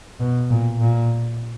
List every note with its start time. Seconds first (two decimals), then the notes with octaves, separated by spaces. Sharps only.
0.20 B2
0.50 A#2
0.81 A#2